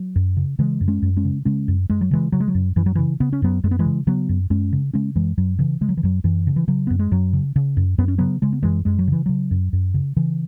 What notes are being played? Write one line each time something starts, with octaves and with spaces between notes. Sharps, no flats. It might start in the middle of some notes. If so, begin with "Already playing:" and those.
Already playing: F#3
F#2
C#3
C#3 E3 G#3
F#2
G#3 C#4
F#2
G#3 C#4
C#3
C#3 G#3 C#4
F#2
F#2 G#3
F#3
C#3 E3 G#3
C#3 F#3
G#3
F#3
F#2
F#2 E3
F#3
C#3 E3
C#3 B3
C#4
F#2 F#3 B3
F#2 G#3
B3
E3 G#3
C#3
C#3 F#3 B3
F#2
F#2 G#3 C#4
C#3
C#3 G#3 C#4
F#2 E3 G#3
F#2 F#3
C#3 E3
C#3 G#3
F#3
E3
F#2 F#3
F#2 E3
C#3
E3
C#3 F#3
F#2 B3
G#3
F#2 F#3
C#3
C#3
F#2
F#2 B3
C#4
C#3 F#3 B3
C#3 G#3
B3
F#2 E3 G#3
F#2 G#3
F#3
C#3 E3
C#3 F#3
F#2
F#2
C#3
C#3 E3